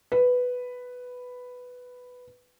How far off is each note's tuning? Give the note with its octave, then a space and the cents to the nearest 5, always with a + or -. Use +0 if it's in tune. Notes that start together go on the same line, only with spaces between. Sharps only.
B4 +5